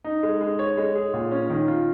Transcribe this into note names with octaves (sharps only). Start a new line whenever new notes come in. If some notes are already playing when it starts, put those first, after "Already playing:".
D#4
G#3
G#3
C#5
G#3
G#4
A#2
C#4
D#3
F4